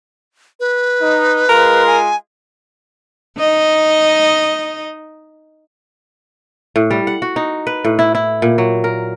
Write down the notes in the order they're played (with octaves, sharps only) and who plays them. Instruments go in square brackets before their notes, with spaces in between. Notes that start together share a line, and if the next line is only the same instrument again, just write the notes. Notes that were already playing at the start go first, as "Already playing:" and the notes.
[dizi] B4
[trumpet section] D#4
[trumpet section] G#3 F4 [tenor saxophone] A#4
[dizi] G#5
[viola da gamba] D#4 D#5
[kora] A2
G3
F#5
F#4
D#4
B4
A2
E4
E4
A#2
F#3
A#4